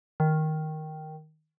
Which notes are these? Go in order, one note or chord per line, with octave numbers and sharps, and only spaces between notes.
D#3